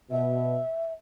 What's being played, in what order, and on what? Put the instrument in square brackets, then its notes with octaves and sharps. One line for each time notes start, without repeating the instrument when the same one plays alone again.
[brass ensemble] B2 [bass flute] E5